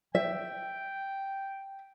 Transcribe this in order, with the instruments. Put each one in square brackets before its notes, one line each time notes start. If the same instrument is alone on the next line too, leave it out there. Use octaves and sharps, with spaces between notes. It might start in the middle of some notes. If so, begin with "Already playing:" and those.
[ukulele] E5 [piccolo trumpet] G5